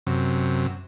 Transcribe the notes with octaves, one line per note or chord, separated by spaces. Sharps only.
F#2 C3